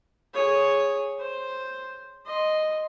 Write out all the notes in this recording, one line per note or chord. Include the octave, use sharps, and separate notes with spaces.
G#4 C#5
C5
D#5 C6